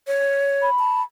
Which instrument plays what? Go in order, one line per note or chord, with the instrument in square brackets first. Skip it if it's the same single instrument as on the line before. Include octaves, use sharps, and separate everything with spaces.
[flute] C#5
[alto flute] B5
[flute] A5